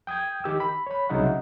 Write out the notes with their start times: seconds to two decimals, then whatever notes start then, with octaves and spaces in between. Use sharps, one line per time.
0.07 G5 D#6 G6 G#6
0.44 D#3 G4 E6
0.60 B5
0.87 C#5 B5
1.09 C2 C#3 F#3 D#4 E5 F#5